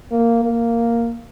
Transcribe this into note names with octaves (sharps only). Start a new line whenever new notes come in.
A#3
A#3